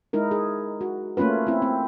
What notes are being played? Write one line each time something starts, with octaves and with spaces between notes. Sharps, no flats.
G#3 D#4 E4 A#4
G#4
F#4
A3 A#3 C#4 F4 B4
C4 E4
C4